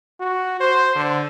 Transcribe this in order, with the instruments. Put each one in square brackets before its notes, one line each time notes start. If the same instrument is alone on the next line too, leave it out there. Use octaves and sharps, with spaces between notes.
[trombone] F#4
C5
D3